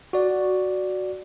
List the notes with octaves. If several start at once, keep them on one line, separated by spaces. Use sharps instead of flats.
F#4 D5